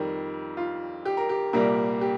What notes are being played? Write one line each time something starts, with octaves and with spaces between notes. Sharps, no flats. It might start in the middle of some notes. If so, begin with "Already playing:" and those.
Already playing: F2 D#3 G3 A#4
F4
G4
A#4
G4
C2 A#2 G3 A#3 A#4
G4